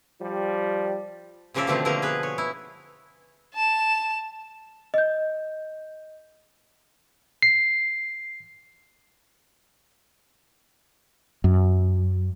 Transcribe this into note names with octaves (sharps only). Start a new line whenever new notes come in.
F3 G3
A#2 C#3 F3 A#3 D5 E5
B2 D3 D#3 F3 A3 C4
B2 D3 F3 A3 A#3 A#4
G#4 B4
C#5
E4
A5 E7
D#5 G6
C7
F#2